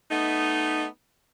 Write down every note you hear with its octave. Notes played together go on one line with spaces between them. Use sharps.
A3 B3 D#4